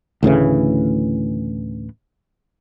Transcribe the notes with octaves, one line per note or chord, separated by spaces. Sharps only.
D2 A2 C#3 E3